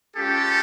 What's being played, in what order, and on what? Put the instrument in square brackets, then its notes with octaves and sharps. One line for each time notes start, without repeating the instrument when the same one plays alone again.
[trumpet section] G#3 C#4 F4 G4 A4